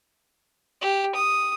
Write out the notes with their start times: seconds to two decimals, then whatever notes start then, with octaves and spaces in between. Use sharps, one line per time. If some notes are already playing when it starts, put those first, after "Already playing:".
0.82 G4
1.15 D#6